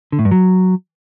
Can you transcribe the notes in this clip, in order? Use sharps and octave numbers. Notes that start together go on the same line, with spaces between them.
D3
A2
G2
F#3